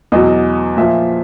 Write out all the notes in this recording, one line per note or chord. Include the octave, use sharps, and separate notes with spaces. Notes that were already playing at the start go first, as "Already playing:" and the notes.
E2 B2 F#3 D#5
A#2 F3 E5